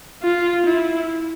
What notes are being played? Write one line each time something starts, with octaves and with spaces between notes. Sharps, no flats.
F4
E4